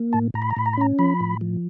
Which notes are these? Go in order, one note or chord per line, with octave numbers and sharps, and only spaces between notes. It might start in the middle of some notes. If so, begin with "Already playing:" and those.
Already playing: A#3
A2 A5
A2 A#5
B5
A#5
A2 B5
A#5
B5
C#4 A#5
F3 B5
A2
F3